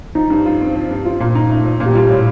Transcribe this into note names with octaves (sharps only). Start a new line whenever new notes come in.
F3 D#4
G2
F4
C4
F3
G2
F3 F4
A#2
D#4
A3
F3
A#2
G4
G3 F4
A2